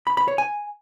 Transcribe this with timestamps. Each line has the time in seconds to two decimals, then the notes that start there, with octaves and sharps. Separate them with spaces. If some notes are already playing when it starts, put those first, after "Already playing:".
0.07 B5
0.17 B5
0.28 C#5
0.38 G#5